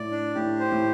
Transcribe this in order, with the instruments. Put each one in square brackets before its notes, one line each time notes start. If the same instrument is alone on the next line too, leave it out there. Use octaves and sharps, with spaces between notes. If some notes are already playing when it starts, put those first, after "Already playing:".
Already playing: [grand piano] A2 [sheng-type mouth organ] D5
[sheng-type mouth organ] D4
[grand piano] A2 [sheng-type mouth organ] G4
[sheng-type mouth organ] C5
[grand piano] A2